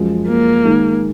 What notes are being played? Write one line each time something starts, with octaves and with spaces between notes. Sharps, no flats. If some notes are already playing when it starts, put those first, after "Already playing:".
Already playing: F#2 F3 G#3
A#3
D#3 G#3 D#4